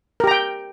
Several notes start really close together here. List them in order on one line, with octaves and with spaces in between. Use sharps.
A#4 G4 A#5 G5